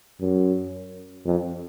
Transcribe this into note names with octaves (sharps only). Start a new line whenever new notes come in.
F#2
F2